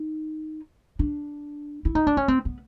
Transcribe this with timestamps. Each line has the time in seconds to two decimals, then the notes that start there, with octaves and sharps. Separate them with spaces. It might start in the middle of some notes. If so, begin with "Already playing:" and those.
Already playing: D#4
0.99 D4
1.85 E4
1.95 D#4
2.07 D4
2.17 C#4
2.28 C4
2.45 B3